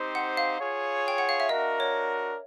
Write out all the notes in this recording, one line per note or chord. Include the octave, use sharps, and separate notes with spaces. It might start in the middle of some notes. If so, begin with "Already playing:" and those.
Already playing: C4 D#4 G4 C5
F#5
F5
F4 G#4 C#5
G5
F#5
F5
E5
D4 F#4 A#4 D#5
C#5